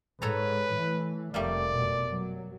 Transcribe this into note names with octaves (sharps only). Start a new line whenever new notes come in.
G#2 G#3 A4 B4 C#5 A#5
E3 A3
F1 G3 A3 A#3 D5
F#2 B2
F#3